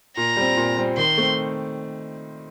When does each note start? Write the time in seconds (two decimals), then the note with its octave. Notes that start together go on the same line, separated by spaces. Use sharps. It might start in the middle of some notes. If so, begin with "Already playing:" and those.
0.16 A#2 A#5
0.37 G3 C4
0.57 A#2
0.77 G3 C4
0.97 D#3 C6
1.18 A3 C4